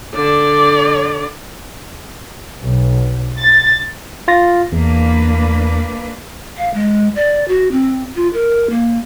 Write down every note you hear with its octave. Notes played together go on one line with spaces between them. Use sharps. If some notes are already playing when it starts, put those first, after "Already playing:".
D3 D5
B1
A6
F4 A6 A#6
E2 A#3 D4 B4
F5
G#3
D5
F#4
C4
F4
A#4
A#3